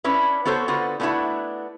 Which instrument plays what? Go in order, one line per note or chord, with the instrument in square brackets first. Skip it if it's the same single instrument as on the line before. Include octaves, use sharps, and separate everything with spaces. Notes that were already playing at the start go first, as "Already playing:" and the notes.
[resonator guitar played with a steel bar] C#4 D4 E4 B4
B3 F#4 A4 C5 C#5
D3 B3 F4 F#4
A3 B3 C#4 D4 E4 F#4